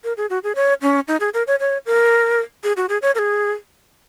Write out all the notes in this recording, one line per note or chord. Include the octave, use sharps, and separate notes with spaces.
A#4
G#4
F#4
G#4
C#5
C#4
D#4
G#4
A#4
C#5
C#5
A#4
G#4
F#4
G#4
C#5
A#4
G#4